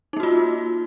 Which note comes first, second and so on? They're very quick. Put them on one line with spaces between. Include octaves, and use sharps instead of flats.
D#4 A#3 F#4 F4